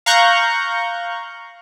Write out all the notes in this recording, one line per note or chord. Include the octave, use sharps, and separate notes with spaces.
F5 A#5 C#6 F#6 G6